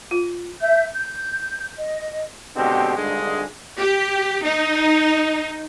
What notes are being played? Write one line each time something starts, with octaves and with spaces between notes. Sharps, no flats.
F4
E5 G6
G6
D#5
D#2 B2 D3 G#3 C4 G4
G#1 G2 D3 G#3 G#4
G4
D#4